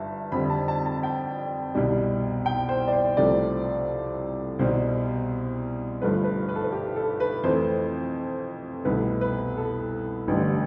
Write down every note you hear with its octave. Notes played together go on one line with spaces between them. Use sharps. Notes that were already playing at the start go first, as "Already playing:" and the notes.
Already playing: G1 G2 E5 A5
F2 D3 G3 B5
A5
A5
A5
G5
C2 B2 G3
G5
C5
D5
C5
C2 C3 F3 A3 D5
C2 B2 G3 C5
G1 G2 F3 A3 B4
B4
B4
A4
B4
G4
A4
B4
F2 E3 A3 C5
C2 B2 A3 B4
B4
A4
A1 G2 D3